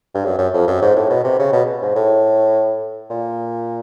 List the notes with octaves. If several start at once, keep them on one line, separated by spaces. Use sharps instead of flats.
G2
F#2
F#2
F2
F#2
G#2
A2
B2
C3
C#3
B2
G#2
A2
A#2